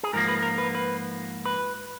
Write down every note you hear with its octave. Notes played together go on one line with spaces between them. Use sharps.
G#4
G#2 F3 A#3 A#4
B4
A#4
B4
B4
B4